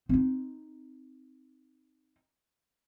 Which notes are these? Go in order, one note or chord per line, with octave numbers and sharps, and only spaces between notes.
C4 D#4